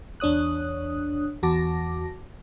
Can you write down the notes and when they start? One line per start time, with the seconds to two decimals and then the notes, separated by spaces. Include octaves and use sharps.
0.20 E2 D4 C#5 D#6 F#6
1.43 E2 F#4 A5 D6 A#6